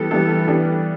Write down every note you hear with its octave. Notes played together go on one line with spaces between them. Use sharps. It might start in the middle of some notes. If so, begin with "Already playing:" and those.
Already playing: E3 G3 B3 A4
E3 G3 B3 E4 A4
E3 G3 B3 D4